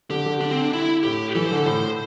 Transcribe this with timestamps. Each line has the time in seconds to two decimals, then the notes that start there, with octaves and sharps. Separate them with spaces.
0.10 D3 G4
0.26 D3
0.41 D4
0.51 C4
0.62 D4
0.73 E4
1.03 A2 G4
1.35 E3 A4
1.46 C5
1.51 D3 A4
1.66 A2 C5